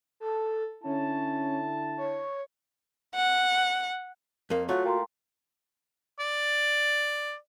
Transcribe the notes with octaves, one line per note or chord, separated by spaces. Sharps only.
A4
D3 C#4 E4 A5
C#5
F#5
F2 A#3 A#4
F#3 A3 F4 F#4 C#6 F#6
A#3 G5 A#5 C6
D5